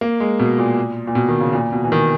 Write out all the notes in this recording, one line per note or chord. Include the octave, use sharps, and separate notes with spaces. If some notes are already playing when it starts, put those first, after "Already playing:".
A#3
G#3
B2
A#2
A#2
B2
D#3
C#3
A#2
B2
E3
D#3